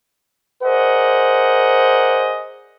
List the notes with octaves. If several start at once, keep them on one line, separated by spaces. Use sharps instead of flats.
G#4 A#4 C5 D5 D#5 F#5